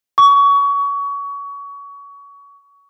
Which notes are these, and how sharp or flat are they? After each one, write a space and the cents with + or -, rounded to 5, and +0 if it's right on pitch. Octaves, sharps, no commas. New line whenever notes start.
C#6 +25